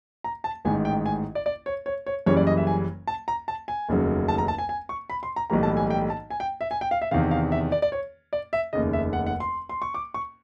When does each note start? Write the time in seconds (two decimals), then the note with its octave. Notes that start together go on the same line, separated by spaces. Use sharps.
0.24 A#5
0.44 A5
0.65 A1 G#2 D#3 G#5
0.85 G5
1.06 G#5
1.35 D5
1.46 D5
1.66 C#5
1.86 C#5
2.06 C#5
2.26 F#1 F#2 C#3 E3 G3 C#5
2.37 D5
2.47 D#5
2.57 E5
2.67 G#5
3.07 A5
3.28 A#5
3.48 A5
3.68 G#5
3.89 F1 D#2 C#3 F#3
4.28 A5
4.38 A#5
4.48 A5
4.58 G#5
4.69 G#5
4.89 C#6
5.10 B5
5.23 C6
5.36 A#5
5.50 B1 A2 E3 G3 A#3 A#5
5.63 A5
5.77 G#5
5.90 G5
6.10 A5
6.30 G#5
6.40 G5
6.61 E5
6.71 G#5
6.81 G5
6.91 F5
7.02 E5
7.11 E2 C3 D#3 F5
7.31 F5
7.52 E5
7.72 D5
7.82 D5
7.92 C#5
8.33 D5
8.53 E5
8.73 F1 D#2 C#3 D#5
8.93 E5
9.13 F#5
9.27 F#5
9.40 C6
9.69 C6
9.82 C#6
9.94 D6
10.14 C#6